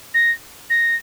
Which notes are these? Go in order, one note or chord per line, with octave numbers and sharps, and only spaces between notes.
A#6
A#6